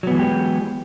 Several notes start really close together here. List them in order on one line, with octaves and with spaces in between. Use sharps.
F#3 B3 E3 G#3 G4